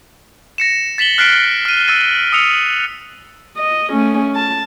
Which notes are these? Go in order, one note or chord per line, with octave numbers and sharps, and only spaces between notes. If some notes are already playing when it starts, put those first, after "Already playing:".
A#6 C#7 E7
A6 B6 E7 F#7 G7
F6 F#6 A6 B6 C7 D7
F6 D#7
E6 A6 D#7
D#6 E6 C#7 F7
D#5
A3 C#4
A5